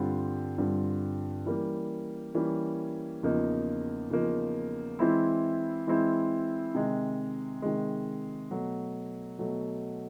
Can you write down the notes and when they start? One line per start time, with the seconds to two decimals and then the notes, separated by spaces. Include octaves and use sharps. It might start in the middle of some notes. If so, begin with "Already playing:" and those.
Already playing: G2 D3 G3 C4 F4
0.58 G2 D3 G3 C4 F4
1.46 E3 G3 A#3 C#4
2.35 E3 G3 A#3 C#4
3.23 E2 C#3 F3 A#3 D#4
4.10 E2 C#3 F3 A#3 D#4
4.99 E3 G#3 C4 E4
5.87 E3 G#3 C4 E4
6.75 C3 D#3 G#3
7.62 C3 D#3 G#3
8.51 B2 F#3 A3
9.39 B2 F#3 A3